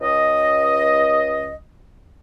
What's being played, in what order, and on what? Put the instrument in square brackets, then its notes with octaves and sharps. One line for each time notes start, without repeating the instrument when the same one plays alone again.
[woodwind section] C#2 D#5